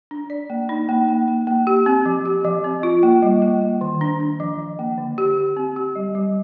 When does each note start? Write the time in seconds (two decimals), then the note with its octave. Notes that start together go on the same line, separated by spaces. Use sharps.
0.11 D4
0.30 D5
0.50 A#3
0.69 D#4
0.89 A#3
1.08 A#3
1.28 A#3
1.47 A#3
1.67 G4
1.86 C4
2.06 F3
2.25 G4
2.45 F3
2.64 C4
2.83 F4
3.03 A#3
3.22 G3
3.42 A#3
3.62 A#3
3.81 D#3
4.01 D4
4.20 D4
4.40 F3
4.59 F3
4.79 A#3
4.98 D3
5.18 G4
5.37 G4
5.57 C4
5.76 G4
5.95 G3
6.15 G3